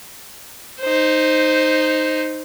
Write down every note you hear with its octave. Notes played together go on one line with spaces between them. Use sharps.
D#4 C5